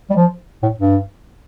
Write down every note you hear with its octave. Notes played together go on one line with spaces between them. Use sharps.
G3
F3
A2
G2